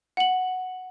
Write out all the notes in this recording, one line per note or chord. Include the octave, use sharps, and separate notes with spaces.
F#5 F#7